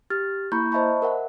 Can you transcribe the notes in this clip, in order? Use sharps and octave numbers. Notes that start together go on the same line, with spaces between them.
G4 F6 A6
A#3 E4 A#5 B5 C#6 G6
C5 D#5 E5 A5 B5 C#6
A#4 E5 F#5